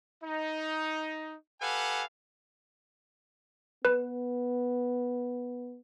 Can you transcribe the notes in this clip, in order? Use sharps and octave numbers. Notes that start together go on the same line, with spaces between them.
D#4
G4 A4 B4 F5 F#5 G#5
B3 B4